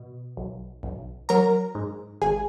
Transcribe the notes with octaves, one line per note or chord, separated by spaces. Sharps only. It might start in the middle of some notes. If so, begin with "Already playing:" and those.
Already playing: B2
B1
B1
F#3 A#4 A#5
G#2
G#1 G#4 G#5